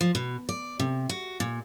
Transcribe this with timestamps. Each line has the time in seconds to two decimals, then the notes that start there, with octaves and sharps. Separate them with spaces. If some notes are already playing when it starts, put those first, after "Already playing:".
0.01 F3
0.15 B2
0.49 D5
0.80 C3
1.09 F#4
1.40 A#2